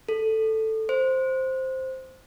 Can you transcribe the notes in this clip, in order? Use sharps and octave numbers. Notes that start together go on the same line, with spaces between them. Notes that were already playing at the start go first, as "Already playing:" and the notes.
A4
C5